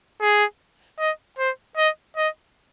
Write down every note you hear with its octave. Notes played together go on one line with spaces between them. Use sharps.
G#4
D#5
C5
D#5
D#5